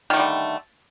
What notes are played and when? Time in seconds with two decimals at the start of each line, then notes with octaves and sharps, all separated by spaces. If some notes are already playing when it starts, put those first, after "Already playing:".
0.10 D#3
0.13 A3
0.16 D3
0.20 G3